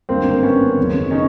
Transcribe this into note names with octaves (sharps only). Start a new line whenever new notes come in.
G#1 G2 D3 A#3 C4
B3 C#4
F#1 F#2 D#3
C#4 D#4